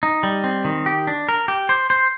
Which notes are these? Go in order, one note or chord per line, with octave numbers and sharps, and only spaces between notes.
D#4
G3
C4
D#3
G4
D4
A#4
G4
C5
C5